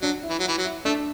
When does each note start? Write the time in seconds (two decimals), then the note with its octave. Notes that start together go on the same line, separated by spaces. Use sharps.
0.02 F#3 D4
0.23 E4
0.29 E3
0.39 F#3 E4
0.48 E3
0.58 F#3
0.65 E4
0.85 A3 D4